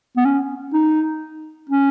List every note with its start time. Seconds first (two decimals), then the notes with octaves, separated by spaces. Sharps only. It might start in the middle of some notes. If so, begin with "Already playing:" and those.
0.17 B3
0.25 C#4
0.73 D#4
1.69 C#4